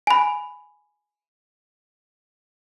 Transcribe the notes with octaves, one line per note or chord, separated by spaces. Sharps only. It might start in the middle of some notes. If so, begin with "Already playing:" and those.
G#5 B5